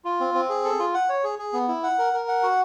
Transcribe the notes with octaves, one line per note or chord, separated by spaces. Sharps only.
F4
C4
C4
G#4
A4
F4
F#5
C#5
G#4
G#4
B3
E4
F#5
A#4
A#4
F#5
F#4